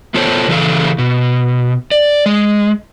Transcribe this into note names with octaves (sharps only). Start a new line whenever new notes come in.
B3 F4 A4 C5 C#5 G5
C#3 E3 A4 F5
B2
D5
G#3